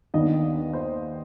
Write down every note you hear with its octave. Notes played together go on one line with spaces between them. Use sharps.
D#2 D#3 B3 D4 D#5
C5